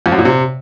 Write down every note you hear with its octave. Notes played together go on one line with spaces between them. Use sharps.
F2
F#2
A#2
C3